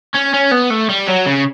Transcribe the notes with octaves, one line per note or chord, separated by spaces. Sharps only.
C#4
C#4
B3
A3
G3
F#3
C#3